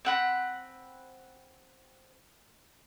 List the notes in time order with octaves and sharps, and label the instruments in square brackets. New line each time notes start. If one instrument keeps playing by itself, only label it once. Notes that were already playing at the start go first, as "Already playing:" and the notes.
[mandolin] C4 F#5 B5